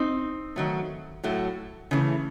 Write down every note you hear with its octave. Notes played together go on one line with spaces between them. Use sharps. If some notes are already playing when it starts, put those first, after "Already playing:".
Already playing: C4 D#4
D#3 F#3 A3
A2 F#3 A3
C#3 E3 A3